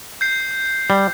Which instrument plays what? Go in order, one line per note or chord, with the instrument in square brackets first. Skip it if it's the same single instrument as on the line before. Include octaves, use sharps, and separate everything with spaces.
[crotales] G6 C7
[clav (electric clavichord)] G3